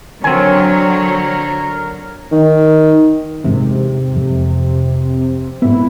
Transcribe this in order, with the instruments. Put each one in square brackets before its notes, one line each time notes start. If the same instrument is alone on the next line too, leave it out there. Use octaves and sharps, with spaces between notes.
[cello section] D3 F#3 C#5 [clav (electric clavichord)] C4 G#5 [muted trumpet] A#4
[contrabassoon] D#3
[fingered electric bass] E2 G#2 [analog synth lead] C3
[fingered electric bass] F2
[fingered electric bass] G#2 B3 [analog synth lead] E4